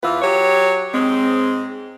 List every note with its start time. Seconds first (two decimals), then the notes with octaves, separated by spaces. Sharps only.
0.03 E2 E3 F4 B4
0.22 F#3 G4 C#5
0.94 G#2 G#3 C4